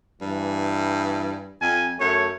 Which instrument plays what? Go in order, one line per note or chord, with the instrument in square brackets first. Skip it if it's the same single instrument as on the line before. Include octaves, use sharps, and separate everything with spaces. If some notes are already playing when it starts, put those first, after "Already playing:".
[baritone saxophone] G2 [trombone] E3
[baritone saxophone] F2 [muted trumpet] G#5
[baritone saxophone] F#2 [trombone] A3 [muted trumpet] C#5